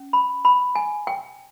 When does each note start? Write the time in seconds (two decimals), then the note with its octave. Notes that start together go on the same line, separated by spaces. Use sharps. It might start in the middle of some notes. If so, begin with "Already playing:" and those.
Already playing: C#4
0.13 B5
0.45 B5
0.75 G#5
1.07 G5